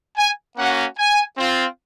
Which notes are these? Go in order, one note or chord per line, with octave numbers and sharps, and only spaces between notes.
G#5
A#3 C#4 F#4 F#5
G#5
C4 F4